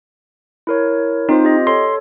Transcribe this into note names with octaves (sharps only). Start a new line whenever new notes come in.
E4 A#4 C#5
C4 D#4 F4 C5
G4 D#5
A4 C#5 C6